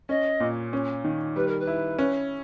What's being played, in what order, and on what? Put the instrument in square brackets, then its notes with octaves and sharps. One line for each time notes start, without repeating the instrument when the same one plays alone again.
[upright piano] C#4 [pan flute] D#5
[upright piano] A#2
C#4
D#3
[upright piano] G3 [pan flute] B4
[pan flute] A#4
B4
[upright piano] E4
C#4